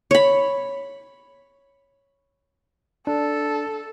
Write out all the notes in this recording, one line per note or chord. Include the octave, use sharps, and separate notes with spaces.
C#5 B5
D4 A4